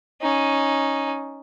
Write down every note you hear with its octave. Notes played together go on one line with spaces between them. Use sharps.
C#4 D#4